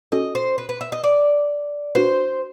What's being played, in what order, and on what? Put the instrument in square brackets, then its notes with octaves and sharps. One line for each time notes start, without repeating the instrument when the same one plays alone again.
[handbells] C#4 F#4 A4 [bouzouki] D#5
[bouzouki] C5
B4
B4
E5
D#5
D5
[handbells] D4 F#4 B4 [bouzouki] C5